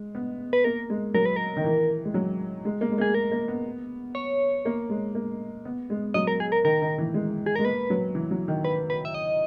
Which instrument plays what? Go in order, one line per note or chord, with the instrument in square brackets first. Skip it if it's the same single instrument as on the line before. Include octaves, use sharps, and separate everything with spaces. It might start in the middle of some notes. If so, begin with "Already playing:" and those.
Already playing: [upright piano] G#3
B3
[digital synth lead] B4
[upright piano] A#3 [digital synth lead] A#4
[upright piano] G#3
[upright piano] F#3 [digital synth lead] A#4
[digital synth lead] B4
A#4
[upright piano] D#3
E3
G#3
F#3
G#3
A#3
G#3
[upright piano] A#3 [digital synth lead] G#4
[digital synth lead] A#4
[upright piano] A#3
B3
[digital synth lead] C#5
[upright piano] A#3
G#3
A#3
B3
G#3
[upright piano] F#3 [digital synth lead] D#5
[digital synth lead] A#4
G#4
A#4
[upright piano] D#3 [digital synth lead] A#4
[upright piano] D#3
E3
G#3
[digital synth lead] G#4
[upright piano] G#3 [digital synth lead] A#4
[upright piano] A#3 [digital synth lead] B4
[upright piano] F#3
E3
F#3
D#3
[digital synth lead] B4
B4
E5
D#5